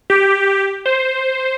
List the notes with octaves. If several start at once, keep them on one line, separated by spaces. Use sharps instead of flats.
G4
C5